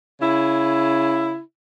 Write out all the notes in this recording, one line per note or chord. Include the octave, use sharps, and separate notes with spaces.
C#3 E4